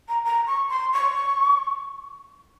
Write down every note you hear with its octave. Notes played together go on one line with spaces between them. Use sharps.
A#5
A#5
C#6
C6
C#6